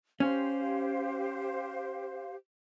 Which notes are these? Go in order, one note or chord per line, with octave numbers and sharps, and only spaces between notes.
C#4 G4 C5 F5